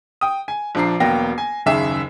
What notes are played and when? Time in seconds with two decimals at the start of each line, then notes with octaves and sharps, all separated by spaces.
0.21 G5 D#6
0.48 G#5
0.75 A#1 F3 D4 A#5 C7
1.00 E1 F#3 A#3 B3 G5 A#6
1.38 G#5
1.66 F#1 D#2 C#3 G#4 E5 E7